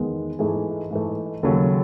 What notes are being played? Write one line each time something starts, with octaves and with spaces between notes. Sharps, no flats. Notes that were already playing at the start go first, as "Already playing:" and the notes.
Already playing: E2 D#3 G#3 B3
G#2 E3 A3 G#4
G#2 E3 A3
D#2 C#3 F#3 A4